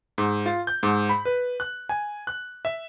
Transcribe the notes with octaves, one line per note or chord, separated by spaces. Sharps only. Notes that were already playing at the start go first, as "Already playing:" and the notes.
G#2
F4
G6
G#2
B5
B4
F#6
G#5
F#6
E5